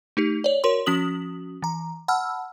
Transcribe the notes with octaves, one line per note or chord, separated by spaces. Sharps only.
A3 D#4 G4
C#5 D5
F#4 A#4 C#5 C6
F3 C#4 F#4 D#6 F#7
E3 A#5
F#5 A5 B5 E6 F6